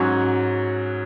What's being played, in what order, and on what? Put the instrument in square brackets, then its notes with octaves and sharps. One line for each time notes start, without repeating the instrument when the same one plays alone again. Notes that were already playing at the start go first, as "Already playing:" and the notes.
Already playing: [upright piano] G#2 F#3 C#4 F#4 C#5